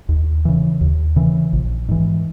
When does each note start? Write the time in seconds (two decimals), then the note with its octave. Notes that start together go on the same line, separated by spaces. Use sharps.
0.09 D#2
0.45 C#3 E3
0.81 D#2
1.16 C#3 E3
1.53 A#1
1.88 G#2 E3